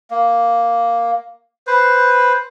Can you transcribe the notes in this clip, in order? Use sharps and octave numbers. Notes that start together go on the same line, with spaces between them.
A#3
B4 C5